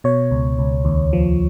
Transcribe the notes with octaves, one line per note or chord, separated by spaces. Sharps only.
B2 C#5
C#2
C#2
D#2
F3